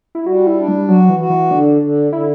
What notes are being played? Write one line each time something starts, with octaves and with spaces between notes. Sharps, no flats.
E4
G3 F#4
E4
D4
G3
F#3 F#4
E3
F#4
E3
D3 D4
D3
D3 E4